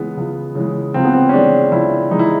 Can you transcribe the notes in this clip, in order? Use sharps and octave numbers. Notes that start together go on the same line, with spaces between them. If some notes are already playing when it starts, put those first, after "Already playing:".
Already playing: C#2 C#3 E3 G#3 B3
C#2
C#3 E3 G#3
C#2 C4
B3
C4
C#4
C#3 E3 G#3 D4
C#2 E4
C#3 E3 G#3 D#4
E4